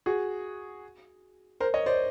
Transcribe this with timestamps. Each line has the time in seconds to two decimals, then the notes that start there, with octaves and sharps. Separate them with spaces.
0.06 F#4 G#4
1.60 A#4 C5
1.74 C#5 D#5
1.86 C5 D5